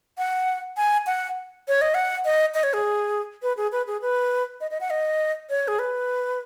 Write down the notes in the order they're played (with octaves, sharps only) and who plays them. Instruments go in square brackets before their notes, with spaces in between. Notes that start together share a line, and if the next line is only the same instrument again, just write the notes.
[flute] F#5
G#5
F#5
C#5
D#5
F#5
D#5
D#5
C#5
G#4
B4
G#4
B4
G#4
B4
D#5
D#5
F#5
D#5
C#5
G#4
B4